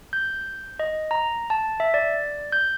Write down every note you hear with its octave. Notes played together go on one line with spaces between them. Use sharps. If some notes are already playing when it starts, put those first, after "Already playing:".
G6
D#5
A#5
A5
E5
D5
G6